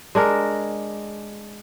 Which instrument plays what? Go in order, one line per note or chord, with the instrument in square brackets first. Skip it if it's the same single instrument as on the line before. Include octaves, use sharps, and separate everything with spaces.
[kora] G#3 D4 A#4